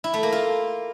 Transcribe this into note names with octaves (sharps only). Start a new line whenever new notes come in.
E4
A3
A#3
F4